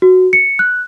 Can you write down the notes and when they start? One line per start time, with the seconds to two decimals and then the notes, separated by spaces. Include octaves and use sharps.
0.02 F#4
0.33 C#7
0.59 F#6